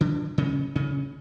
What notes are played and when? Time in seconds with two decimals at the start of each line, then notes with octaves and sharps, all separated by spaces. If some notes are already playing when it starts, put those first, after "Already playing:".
0.01 D3 D4
0.38 C#3 C#4
0.76 C#3 C#4